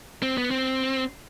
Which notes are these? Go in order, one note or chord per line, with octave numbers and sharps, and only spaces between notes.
C4
B3
C4